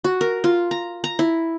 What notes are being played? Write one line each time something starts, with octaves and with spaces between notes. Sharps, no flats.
F#4
A#4
F4
A#5
A#5
E4